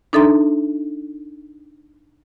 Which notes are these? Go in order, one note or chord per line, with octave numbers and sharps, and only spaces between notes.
D4 D#4 A4 E5 A#5 C6